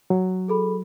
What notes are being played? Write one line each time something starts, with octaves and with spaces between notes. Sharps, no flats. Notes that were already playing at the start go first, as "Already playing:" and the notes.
F#3
G#4 A4 B5